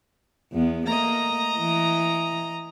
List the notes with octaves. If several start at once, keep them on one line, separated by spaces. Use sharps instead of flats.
E2 B3
A3 A#3 D#5 A#5
E3